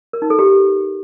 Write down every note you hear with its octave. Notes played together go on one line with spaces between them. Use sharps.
A#4
D#4
A4
G4